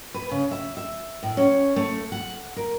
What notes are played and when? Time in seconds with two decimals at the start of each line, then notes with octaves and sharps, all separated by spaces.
0.14 B4
0.31 C#3
0.51 E5
0.77 E5
1.23 A2
1.37 C#4
1.76 A3
2.12 F#5
2.56 A#4